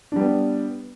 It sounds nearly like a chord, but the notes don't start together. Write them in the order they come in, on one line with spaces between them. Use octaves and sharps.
D4 G3 B3